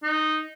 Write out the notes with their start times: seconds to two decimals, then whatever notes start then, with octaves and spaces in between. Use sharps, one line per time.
0.03 D#4